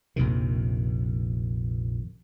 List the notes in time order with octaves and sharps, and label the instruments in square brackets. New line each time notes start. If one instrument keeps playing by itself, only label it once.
[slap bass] A#1 F2 C3 D#3